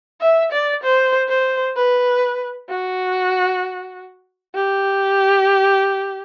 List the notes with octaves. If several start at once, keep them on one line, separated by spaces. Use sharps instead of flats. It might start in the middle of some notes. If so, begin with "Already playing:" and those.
E5
D5
C5
C5
B4
F#4
G4